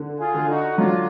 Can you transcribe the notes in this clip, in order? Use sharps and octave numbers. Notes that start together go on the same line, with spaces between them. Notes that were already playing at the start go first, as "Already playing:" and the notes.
Already playing: D3
F4 G#4
D3
D#4 F#4
F#3 D4 F4